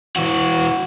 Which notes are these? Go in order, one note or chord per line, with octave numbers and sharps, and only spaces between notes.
E3 F#4